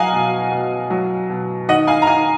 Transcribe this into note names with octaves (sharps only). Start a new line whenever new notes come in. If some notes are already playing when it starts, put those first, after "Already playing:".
Already playing: B2 F#3 D#5 F5 F#5 G#5 A#5
B2
B2
F#3
B2
D#3 D#5 F#5
F5 G#5
A#5
D#3 F5 G#5